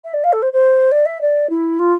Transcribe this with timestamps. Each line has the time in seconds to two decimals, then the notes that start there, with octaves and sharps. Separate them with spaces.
0.04 E5
0.13 D5
0.24 F5
0.32 A4
0.42 C5
0.52 C5
0.91 D5
1.05 E5
1.21 D5
1.49 E4
1.79 F4